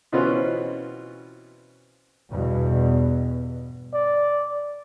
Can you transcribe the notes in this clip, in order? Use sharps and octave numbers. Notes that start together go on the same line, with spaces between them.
B2 E3 C4 C#4 F4 B4
E2 G2 B2
D5